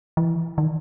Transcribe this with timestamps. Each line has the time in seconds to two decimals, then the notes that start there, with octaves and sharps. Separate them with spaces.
0.17 E3
0.58 D#3